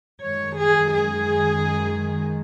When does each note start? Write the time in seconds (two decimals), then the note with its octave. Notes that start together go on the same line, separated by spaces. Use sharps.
0.22 F#2 D#3 G#3 C#5
0.58 G#4
0.93 G#4